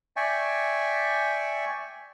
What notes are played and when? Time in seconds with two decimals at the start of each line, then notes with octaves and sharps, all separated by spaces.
0.16 D5 E5 G5 G#5 C#6